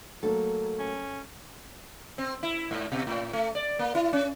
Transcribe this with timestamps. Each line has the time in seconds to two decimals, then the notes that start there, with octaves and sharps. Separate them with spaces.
0.23 F#3 A3 A#3 A4
0.79 C#4
2.18 C4
2.43 E4
2.71 G#2
2.92 B2
3.07 A2
3.33 A3
3.55 D5
3.79 A#3
3.95 E4
4.13 C#4